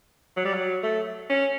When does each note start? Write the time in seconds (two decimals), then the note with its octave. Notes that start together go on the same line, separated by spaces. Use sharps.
0.37 F#3
0.45 G3
0.53 F#3
0.83 A3
1.29 C#4